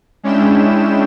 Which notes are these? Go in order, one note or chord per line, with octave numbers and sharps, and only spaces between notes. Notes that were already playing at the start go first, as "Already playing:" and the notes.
G#3 C#4 D4 E4 G5 E7